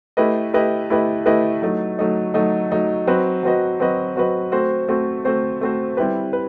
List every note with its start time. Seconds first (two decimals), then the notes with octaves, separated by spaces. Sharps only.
0.17 A3 E4 G4 B4 D#5
0.54 A3 E4 G4 B4 D#5
0.90 A3 E4 G4 B4 D#5
1.26 A3 E4 G4 B4 D#5
1.62 F#3 A3 D#4
1.99 F#3 A3 D#4
2.34 F#3 A3 D#4
2.72 F#3 A3 D#4
3.07 F#3 C4 F#4 B4 D#5
3.43 F#3 C4 F#4 B4 D#5
3.80 F#3 C4 F#4 B4 D#5
4.16 F#3 C4 F#4 B4 D#5
4.52 A3 C4 F#4 C5
4.88 A3 C4 F#4 C5
5.25 A3 C4 F#4 C5
5.61 A3 C4 F#4 C5
5.97 G3 C4 E4 G4 B4
6.33 B4